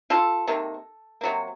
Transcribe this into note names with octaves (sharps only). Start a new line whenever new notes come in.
F4 A4
C3 D#3 A#3
C3 F#3 A#3